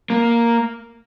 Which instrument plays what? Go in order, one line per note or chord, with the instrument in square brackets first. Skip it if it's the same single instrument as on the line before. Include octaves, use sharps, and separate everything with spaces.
[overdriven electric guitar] A#3